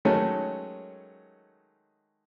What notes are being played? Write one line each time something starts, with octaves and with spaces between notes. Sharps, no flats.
D#3 F#3 G#3 A3 C#4